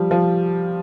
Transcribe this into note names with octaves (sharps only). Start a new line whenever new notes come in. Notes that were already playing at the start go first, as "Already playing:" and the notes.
Already playing: F3 G3
F3